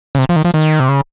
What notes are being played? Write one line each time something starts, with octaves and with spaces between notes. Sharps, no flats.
C#3
C3
F3
D#3
F3
D#3
C3
C#3